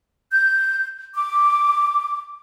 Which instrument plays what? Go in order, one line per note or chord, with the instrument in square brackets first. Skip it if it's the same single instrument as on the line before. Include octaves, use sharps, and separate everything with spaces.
[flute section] G6
D6